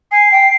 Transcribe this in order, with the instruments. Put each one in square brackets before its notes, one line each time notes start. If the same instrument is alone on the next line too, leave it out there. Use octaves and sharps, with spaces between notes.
[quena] G#5 [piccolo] C7
[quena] G5